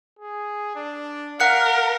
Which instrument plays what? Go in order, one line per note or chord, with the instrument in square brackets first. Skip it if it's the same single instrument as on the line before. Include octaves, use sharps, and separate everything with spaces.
[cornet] G#4
D4
[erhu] A#4 [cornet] F5 [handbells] F#5 F#6 C#7